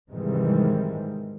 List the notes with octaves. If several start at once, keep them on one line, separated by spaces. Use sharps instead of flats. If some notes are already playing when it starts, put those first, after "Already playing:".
G#2 C3 D#3 E3 G3 G#3